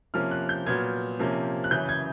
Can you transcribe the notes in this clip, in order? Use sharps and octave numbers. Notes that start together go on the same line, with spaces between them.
C3 F3 A#3 C#4 F6
F#6
G6
A#2 F#3 B3 G#6
C3 F3 A#3 C#4
F#6
F#2 C#3 E3 G6
G#6